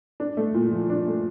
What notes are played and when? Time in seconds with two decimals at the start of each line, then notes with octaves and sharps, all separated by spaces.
0.20 D4
0.37 A3
0.54 A#2
0.71 F3
0.90 D4
1.07 A3